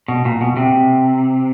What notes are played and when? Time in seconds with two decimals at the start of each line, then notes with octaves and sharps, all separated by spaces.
0.08 B2
0.25 A#2
0.41 B2
0.57 C3